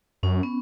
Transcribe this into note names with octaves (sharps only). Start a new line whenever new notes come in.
F#2 C#4
B3